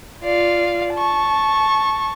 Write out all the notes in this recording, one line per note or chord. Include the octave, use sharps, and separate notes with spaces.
F4 D5 F5
A5 C#6